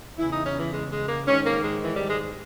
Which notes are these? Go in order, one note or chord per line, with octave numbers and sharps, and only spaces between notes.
E2 C#3 E3 E4
D#4
C#4
E3
G#3
G#3
A#3
G#2 D#3 C#4
A#3
G#3
E3
G3
G#3